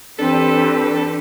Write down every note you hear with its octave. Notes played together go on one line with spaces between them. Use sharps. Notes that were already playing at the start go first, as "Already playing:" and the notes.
E3 C4 D4 G4 A4 B4